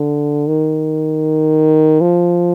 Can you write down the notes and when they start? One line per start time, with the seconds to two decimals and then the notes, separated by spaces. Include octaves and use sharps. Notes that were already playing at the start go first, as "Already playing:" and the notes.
Already playing: D3
0.47 D#3
2.01 F3